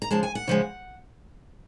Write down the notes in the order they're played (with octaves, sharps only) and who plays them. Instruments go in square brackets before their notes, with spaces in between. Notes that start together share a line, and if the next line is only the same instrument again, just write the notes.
[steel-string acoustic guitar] A#5
C#3 F3 G#3 A5
G#5
F#5
C#3 F3 G#3